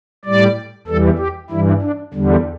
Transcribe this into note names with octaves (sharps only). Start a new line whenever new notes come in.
A2 G3 D5
E2 E3 G3 A4
G4
G2 E3 G3 E4
D4
E2 D3 G3